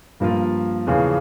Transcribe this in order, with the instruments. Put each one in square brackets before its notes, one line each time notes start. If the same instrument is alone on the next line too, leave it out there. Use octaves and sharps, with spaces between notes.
[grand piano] G2 F3 A#3 F4
E2 C#3 F3